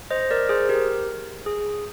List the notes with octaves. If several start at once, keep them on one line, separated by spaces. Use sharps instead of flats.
C5 D#5
A#4 D5
G#4 C5
G4 A#4
G#4